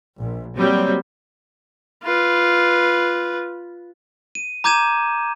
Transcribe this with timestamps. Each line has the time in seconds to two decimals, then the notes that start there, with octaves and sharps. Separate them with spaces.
0.20 A#1
0.57 F#3 G3 A#3 C4
2.03 F4 B4
4.35 D#7
4.64 A#5 D6 G6 G#6 D#7 E7